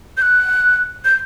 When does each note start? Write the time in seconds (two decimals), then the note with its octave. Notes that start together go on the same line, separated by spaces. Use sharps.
0.17 G6
0.22 F#6
1.05 G6